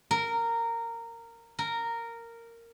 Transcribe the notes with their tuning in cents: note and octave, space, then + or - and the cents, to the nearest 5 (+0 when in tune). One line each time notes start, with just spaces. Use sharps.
A#4 -15
A#4 -10